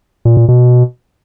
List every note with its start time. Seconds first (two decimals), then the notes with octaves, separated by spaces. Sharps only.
0.25 A#2
0.37 A#2
0.48 B2